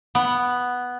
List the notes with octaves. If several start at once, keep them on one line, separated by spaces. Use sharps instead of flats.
B3